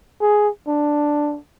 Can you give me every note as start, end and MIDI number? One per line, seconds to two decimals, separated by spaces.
0.21 0.49 68
0.68 1.38 62